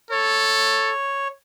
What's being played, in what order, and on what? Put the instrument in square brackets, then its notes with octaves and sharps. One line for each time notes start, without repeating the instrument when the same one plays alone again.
[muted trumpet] A4 [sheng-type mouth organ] C#5